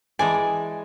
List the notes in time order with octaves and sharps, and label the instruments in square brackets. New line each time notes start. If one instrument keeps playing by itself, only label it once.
[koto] E3 G#3 D5 [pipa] G#5